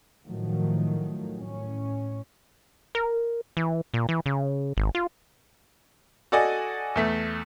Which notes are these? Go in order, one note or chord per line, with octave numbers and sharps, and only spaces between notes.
A2 D#3 F3 F#3 A3
A2 C#4
A#4
E3
A#2
E3
C#3
G#1
F4
F#4 A4 D5 D#5 G#5
E2 A3 B6